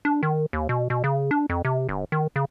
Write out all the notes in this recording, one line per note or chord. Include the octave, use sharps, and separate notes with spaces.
D4
D#3
D#2
B2
B2
C#3
D4
F2
C3
G1
D#3
C#3